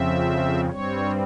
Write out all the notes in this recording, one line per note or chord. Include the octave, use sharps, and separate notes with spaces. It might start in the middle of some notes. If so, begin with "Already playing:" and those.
Already playing: F2 C#3 F3 C4 E5
G2 G3 C4 C#5